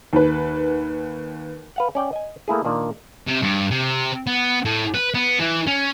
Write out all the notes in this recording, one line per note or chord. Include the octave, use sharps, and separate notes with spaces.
D#2 B4
B4 F5 F#5
C#4 D5 G5
D#5 G#5
A3 A#3 E4 G#4
A#2 D#3 A#3 D4 D5
C3
G2
C3
B3
A2
B4
B3
E3
C#4